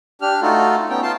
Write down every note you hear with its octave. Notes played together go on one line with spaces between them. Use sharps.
D4 G4 F6
A3 D#4 F4 F#4 A4
B3 C#4 D#4 G5
F4 A5 C6